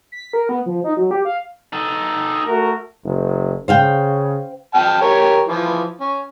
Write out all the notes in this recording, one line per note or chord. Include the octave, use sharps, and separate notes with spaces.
B6
A#4
B3
F3
D#4
F#3
G4
F5
D#4 A4
A3 F#4 A#4
F#1
C#3 C5 F5 G5
G5 A5 F6
G4 A#4 C#5
E3 F3
C#4